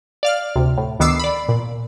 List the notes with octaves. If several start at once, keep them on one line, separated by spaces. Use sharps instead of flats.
D5 F5 F6
D2 C3
A2
D2 D#3 B3 D6 E6 C7
D5 B5
A#2